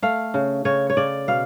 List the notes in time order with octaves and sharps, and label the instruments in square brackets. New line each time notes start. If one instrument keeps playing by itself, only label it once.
[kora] A3 F5
C#3
C#3 C#5
C#5
C#3 D5
B2 F5